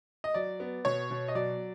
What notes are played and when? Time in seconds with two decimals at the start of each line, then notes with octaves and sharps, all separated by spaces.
0.24 D#5
0.34 F#3 D5
0.60 B3
0.85 B2 C#5
1.11 B2
1.28 D#5
1.35 F#3 D5